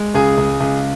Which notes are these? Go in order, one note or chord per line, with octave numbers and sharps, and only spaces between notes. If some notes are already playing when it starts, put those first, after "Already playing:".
Already playing: G#3
C#2 G#4 G#5
C#2
C#2